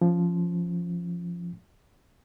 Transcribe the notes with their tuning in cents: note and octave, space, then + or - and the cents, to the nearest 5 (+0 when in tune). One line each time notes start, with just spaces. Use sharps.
F3 -5 C#4 +0